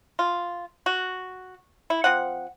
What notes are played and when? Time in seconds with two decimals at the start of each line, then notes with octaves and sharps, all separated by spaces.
0.19 F4
0.86 F#4
1.90 E4
2.04 F3 C4 F#5